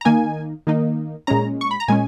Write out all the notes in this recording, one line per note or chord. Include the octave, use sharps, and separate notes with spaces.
A#5
D#3 A#3 D#4 G#5
D#3 A#3 D#4
A#2 G#3 C#4 A#5
C#6
B5
A#5
A#2 G#3 C#4 G#5